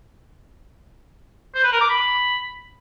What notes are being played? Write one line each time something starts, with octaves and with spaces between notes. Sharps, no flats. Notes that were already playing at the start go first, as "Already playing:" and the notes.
C5
B4
A#4
D6
B5